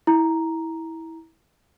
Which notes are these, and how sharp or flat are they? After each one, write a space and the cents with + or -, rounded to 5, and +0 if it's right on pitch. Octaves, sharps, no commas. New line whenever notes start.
E4 -20 A#5 +0